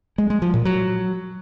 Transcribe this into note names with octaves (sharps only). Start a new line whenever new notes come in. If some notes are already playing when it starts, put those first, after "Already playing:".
G#3
G#3
F3
A#2
F#3